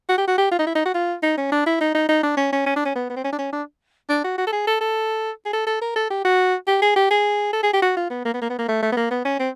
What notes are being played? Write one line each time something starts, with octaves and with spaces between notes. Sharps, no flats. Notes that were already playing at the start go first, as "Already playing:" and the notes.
F#4
G4
F#4
G4
F4
D#4
E4
D#4
F#4
F4
D#4
C#4
D4
E4
D#4
D#4
D#4
D4
C#4
C#4
C#4
D4
C#4
B3
B3
C4
C#4
D4
C#4
D4
D4
F#4
F#4
A4
G#4
A4
A4
G#4
A4
A4
A#4
A4
G4
F#4
G4
G#4
G4
G#4
A4
G#4
G4
F#4
F4
B3
A#3
B3
A#3
B3
A#3
A3
A3
B3
A#3
B3
C#4
C4